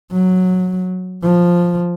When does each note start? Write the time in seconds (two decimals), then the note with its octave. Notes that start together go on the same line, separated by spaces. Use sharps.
0.12 F#3
1.23 F3